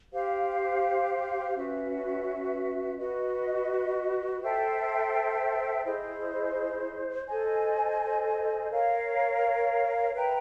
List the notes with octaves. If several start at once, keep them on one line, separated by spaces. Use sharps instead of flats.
G4 C5 F5
C#4 F#4 B4 E5
F#4 B4 D#5
A4 C5 E5 G5
E4 G#4 C5 D#5
A4 C5 D#5 G#5
A#4 C#5 F5
B4 E5 G5 A#5